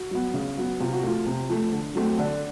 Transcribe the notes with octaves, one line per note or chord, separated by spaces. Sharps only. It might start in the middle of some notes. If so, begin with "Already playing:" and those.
Already playing: F#4
F#3 B3
C#3
F#3 B3
C3 F4
F#4
F3 A3 F4
C3
F3 A3
D3
F#3 A3 C4
D3 D4